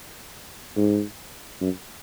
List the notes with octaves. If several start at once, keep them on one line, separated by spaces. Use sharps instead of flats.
G#2
F#2